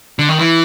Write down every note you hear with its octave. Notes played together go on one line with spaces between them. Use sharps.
D3
D#3
E3